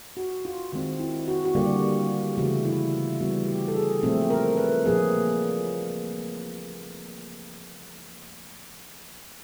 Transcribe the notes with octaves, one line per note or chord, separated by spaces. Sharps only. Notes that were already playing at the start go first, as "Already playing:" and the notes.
F#4
F4
D#3 G#3 C4 F4
E4
F#4
F#4
D3 G3 A#3 G4
C#3 E3 A3 F#4
E4
F4
E3 G3 B3 F#4
G4
A4
G#4
A#2 F3 A3 C4 A4
A#4
B4
A#2 F3 A#3 G#4